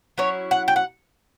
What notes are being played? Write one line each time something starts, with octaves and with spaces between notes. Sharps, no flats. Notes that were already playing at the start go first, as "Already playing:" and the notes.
F#3 C#4 E4 C#5
F#5
G5
F#5